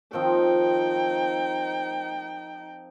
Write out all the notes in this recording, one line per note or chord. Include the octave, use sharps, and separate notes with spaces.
D#3 F3 C4 D#4 G5